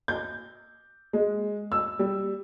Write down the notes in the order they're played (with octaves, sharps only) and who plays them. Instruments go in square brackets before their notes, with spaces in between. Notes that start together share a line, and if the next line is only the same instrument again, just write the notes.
[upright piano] G6
G#3
E6
G3